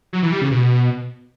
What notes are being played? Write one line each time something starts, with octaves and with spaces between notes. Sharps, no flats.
F#3
E3
G3
C#3
B2